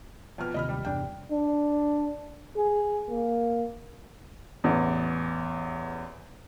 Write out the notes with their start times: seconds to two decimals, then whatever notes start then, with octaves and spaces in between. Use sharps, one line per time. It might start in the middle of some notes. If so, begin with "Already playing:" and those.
0.38 F2 B2 F6
0.54 A1 D#2 C3 D#5 B5 F6
0.69 G3
0.85 E2 G2 C3 D4 G5
1.32 D4
2.58 G#4
3.10 A#3
4.64 A1 E2